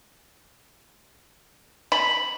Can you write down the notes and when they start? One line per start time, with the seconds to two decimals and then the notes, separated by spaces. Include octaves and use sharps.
1.92 B5